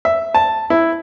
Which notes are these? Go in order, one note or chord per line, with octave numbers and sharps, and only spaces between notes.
E5
A5
E4